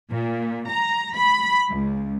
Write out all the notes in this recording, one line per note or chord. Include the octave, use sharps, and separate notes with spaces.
A#2
A#5
B5
C#2